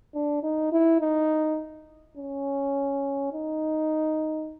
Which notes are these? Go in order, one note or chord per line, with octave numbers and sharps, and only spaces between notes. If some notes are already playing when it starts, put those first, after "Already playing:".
D4
D#4
E4
D#4
C#4
D#4